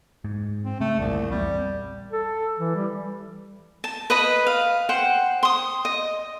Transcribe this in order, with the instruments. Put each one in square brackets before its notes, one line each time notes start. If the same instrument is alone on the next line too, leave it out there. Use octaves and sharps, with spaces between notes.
[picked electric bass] G#2
[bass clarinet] C4
[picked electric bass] C#3 [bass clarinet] A3
[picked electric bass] G1 F2 A#2 [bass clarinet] C2
[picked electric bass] A#1 E2 C4 [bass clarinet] G3
[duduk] A4
E3
G3
[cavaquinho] A5
B4 D#5 B5
F5
C5 F#5 G5
C6 D#6
D#5